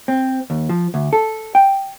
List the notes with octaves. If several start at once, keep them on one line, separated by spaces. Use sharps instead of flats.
C4
D#2
F3
D2
A4
G5